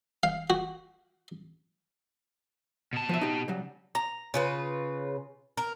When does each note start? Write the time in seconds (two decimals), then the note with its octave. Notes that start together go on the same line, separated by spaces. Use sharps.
0.23 F5
0.50 F#4
2.93 B2 A5
3.09 F3 E5
3.21 D#4 G4
3.48 C#3 F#3 G3
3.95 A#5
4.34 C#3 F4 B4
5.57 A#4